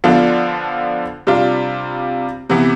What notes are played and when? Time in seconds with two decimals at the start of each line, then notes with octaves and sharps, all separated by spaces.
0.04 D3 F3 B3 D4 F4
1.27 C3 G3 D4 F4
2.50 C3 E3 B3